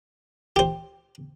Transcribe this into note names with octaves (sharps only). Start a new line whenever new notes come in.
G4 C5